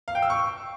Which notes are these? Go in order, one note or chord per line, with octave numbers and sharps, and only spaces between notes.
F5
G5
E6
C#6